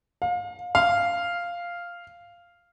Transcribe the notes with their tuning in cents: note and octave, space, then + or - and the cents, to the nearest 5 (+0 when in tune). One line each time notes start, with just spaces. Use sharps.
F5 +30
F5 -5